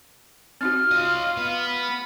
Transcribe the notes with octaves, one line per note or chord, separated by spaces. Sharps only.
C4 D#4 F#4 F6
F4 C#5 D#5
B3
B5